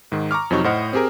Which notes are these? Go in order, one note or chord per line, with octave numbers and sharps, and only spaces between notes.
G#2 D#3
A#5 C#6 D6 F6
F2 C3 F#3 D#4 C#6
A2 C5 D#5 F#5 F6
C4 G4 G#4 A#4